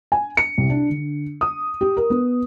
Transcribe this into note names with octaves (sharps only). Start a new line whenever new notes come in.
G#5
C#7
C2
D4
D3
D#6
G4
A#4
B3